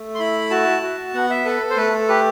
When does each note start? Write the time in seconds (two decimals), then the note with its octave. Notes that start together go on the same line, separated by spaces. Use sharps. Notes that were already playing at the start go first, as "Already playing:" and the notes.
Already playing: A3
0.15 C6
0.19 E4 B5
0.50 F#4 A5
0.82 F#4
1.14 B3 F#5
1.30 E5
1.45 A4 B4
1.70 C5
1.77 A3 B4
1.93 A4
2.08 G4 B4